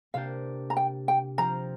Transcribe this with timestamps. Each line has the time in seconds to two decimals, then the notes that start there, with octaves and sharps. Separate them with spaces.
0.14 C3 A#3 D4 G4 F5
0.70 A#5
0.77 G5
1.08 G5
1.38 F3 C4 F4 A#5